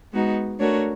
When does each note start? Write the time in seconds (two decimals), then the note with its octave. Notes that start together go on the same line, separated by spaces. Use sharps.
0.13 G#3 B3 D#4 F#4
0.59 A3 D4 F#4 A#4 C#5